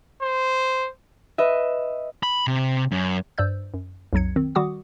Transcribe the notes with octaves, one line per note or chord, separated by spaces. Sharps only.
C5
B4 D#5 E5
B5
C3
F#2
G2 C5 D5 E6 G6
F#2
B1 F2 F#3 G#6 C#7
D#3 C4
D#3 G3 F#4 F#5 D6 D#6